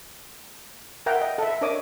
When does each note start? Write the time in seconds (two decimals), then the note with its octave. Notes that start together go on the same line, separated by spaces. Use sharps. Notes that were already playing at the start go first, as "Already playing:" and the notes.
1.06 A#4 E5 F#5 G5 A#5
1.21 D#5
1.38 A4 E5
1.61 D4 A#4 C#5 D#5 D6 D#6